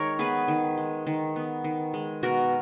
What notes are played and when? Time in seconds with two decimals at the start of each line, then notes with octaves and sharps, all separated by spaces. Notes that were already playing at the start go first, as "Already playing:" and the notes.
Already playing: D#3 G#3 A#4 C#5
0.19 B3 G#4 B4
0.48 D#3
0.78 G#3
1.07 D#3
1.36 B3
1.64 D#3
1.94 G#3
2.23 B2 F#4 A#4